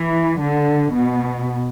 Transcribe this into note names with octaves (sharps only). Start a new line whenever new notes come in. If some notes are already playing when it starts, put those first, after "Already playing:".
Already playing: E3
D3
B2